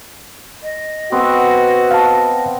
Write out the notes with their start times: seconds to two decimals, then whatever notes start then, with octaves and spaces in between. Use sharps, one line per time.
0.63 D#5
1.12 B3 C4 F#4
1.91 F5 A5